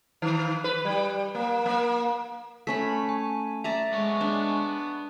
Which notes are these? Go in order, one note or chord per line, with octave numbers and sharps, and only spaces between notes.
D#3
B4
G3
A#3
A#3
A3 C#4 B5 B6
G#5
D5 E5 A5 A#5
G#3 B3 C#5
D4